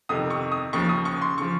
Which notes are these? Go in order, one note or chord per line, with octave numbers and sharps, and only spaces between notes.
F2 C3 D#3 D#6
C#6
D#6
D#2 C#3 F3 C#6
D#6
C#6
C6
C#3 F3 C#6